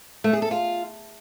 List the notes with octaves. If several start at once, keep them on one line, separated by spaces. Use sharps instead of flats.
A3
G#4
A4
F4